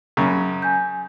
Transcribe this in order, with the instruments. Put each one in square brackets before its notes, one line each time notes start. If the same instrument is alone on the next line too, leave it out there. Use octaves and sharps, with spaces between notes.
[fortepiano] F#2 C#3
[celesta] G#5 G6